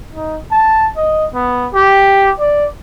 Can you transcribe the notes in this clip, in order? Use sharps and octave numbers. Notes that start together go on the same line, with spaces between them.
D#4
A5
D#5
B3
G4
D5